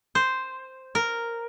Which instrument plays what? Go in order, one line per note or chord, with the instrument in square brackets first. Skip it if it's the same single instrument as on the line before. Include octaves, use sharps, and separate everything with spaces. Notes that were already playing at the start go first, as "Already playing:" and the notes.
[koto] C5
A#4